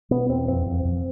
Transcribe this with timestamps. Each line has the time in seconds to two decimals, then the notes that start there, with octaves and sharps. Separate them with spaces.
0.11 B2 B3
0.29 E2 C4
0.48 F2 C4
0.66 F2
0.85 F2